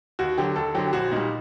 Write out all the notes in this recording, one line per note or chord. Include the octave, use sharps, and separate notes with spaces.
D#2 F#4
D3 F#3 G4
D#2 A4
D3 F#3 G4
G4
A#1 F#4
A#2 G3 D#4